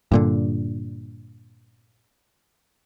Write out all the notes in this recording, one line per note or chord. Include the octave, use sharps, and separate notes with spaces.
G2 A#2 D3